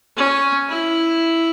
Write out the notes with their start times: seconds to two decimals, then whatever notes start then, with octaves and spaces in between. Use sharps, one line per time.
0.17 C#4
0.70 E4